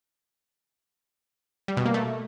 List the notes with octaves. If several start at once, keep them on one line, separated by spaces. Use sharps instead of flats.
G3
B2
A#3
A3